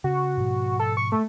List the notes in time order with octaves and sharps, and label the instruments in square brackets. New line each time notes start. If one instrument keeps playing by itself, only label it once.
[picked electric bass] C#3 [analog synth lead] F#4
[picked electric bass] G#2 B2 F3
[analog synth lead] A4
C#6
A3